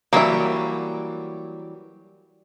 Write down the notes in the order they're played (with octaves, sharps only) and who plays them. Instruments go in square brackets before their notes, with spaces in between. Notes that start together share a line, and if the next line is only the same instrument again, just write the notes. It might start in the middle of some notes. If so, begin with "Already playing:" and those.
[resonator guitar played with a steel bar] E3 F#3 G3 [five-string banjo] A#3 E5